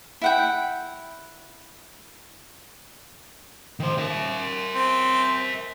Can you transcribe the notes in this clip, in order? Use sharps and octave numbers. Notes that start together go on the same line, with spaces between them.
E4 F#5 G5
D#3 C5
A#4 E5
C4